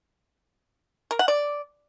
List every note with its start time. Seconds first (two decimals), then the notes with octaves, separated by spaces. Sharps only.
1.11 A#4
1.19 F#5
1.28 D5